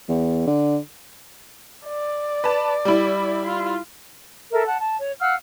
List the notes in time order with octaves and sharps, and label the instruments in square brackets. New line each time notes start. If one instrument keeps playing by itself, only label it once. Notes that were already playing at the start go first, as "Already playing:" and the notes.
[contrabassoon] E2
D3
[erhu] D5
[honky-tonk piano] B4 A5
G3 E4
[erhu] F4
[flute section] A4 A#4 E5
F#5 A5
A5
C#5
F5 F#5 E6 F6